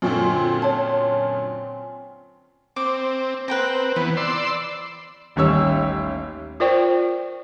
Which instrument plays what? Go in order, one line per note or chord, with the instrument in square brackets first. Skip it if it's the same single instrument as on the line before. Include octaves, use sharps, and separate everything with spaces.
[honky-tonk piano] F#2 A#2 D3 [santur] C4 C#4 F4
[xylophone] C#5 A5
[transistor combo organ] C4 [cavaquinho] D6
[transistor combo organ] C4 [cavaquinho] B4 G5 A#5
[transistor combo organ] E3 B3 [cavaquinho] B5
[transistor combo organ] D5 C6 E6
[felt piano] A1 D#2 G3 C#4 C#5 E6
[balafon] F4 A#4 C5 D5 G5 C#6